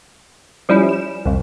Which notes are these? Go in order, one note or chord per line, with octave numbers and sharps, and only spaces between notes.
F3 G3 C#4 E4
E7
C2 F2